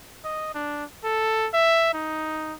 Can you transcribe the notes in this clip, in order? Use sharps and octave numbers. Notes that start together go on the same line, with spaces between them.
D#5
D4
A4
E5
D#4